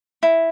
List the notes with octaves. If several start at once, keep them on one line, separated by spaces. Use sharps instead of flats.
E4